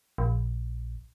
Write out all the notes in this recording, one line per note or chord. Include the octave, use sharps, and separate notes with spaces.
A#1